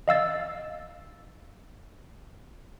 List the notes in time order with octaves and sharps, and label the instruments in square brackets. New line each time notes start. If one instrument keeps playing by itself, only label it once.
[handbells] D#5 F5 E6 A6